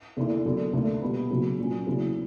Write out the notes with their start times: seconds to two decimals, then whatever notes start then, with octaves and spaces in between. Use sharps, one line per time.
0.17 E2 D3 A#3 E4
0.45 E2 D3 F#3
0.73 D2 D3 A#3
1.01 B2 G3 B3
1.30 C#3 F#3 A#3
1.59 A#2 F#3 C#4
1.87 E2 C#3 F#3 B3 E4